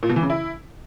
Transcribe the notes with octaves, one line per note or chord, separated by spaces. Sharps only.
A#2
B2
E3
C#3
E4